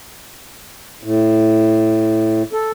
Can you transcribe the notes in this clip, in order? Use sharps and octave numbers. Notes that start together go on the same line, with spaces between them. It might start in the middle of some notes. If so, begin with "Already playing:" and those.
A2
A4